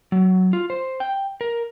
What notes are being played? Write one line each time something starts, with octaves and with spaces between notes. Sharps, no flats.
F#3
F4
C5
G5
A#4